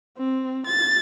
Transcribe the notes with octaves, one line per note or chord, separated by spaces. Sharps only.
C4
A6